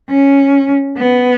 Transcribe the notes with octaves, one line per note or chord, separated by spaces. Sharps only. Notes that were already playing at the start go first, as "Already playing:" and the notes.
C#4
B3